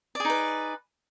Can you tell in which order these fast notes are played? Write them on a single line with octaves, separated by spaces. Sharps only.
D5 G#4 D#4 B4